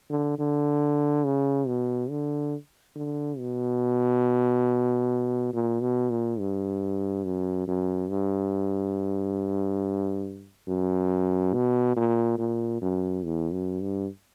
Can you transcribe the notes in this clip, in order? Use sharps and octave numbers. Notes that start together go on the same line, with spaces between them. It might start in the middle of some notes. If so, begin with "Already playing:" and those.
D3
D3
C#3
B2
D3
D3
B2
A#2
B2
A#2
G2
F#2
F#2
G2
F#2
B2
A#2
A#2
F#2
E2
F#2
G2